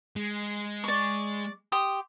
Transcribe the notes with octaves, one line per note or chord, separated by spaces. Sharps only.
G#3
D5 C#6
G4 C6 D#6